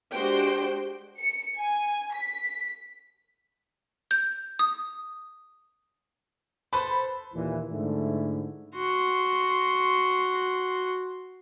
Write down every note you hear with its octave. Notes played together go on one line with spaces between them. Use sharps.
G#3 D4 F#4 G4 C5 G5
C#7
G#5
B6
G6
D#6
A4 B4 C5 B5
D#2 A#2 E3
G#2 D3 A3 E4
F#4 C6